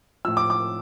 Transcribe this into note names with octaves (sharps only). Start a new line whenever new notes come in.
A2 F3 E6
D6
D6